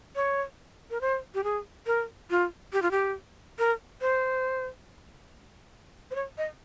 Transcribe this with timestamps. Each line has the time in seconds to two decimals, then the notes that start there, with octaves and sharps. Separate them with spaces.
0.16 C#5
0.90 A#4
1.01 C5
1.34 G4
1.44 G#4
1.87 A#4
2.30 F4
2.73 G4
2.82 F4
2.91 G4
3.59 A#4
4.01 C5
6.11 C5
6.15 C#5
6.38 D#5